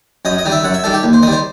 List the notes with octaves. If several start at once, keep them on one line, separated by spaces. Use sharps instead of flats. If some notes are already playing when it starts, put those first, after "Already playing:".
F#2 D#5
D#5
D#3 G3
E5
F#2 F#5
E5
D#3 G3 A4
G4
D#2
C5
D#3 G3 D#5
C5